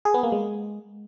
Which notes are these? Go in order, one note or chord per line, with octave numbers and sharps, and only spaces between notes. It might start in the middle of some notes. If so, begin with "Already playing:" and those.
G#4
B3
A#3
G#3